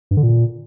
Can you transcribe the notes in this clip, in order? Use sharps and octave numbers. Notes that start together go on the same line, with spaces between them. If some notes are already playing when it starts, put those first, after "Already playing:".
G2
D3
A#2